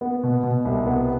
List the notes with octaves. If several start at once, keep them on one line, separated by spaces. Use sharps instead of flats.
B3
B2
B2
C2
B3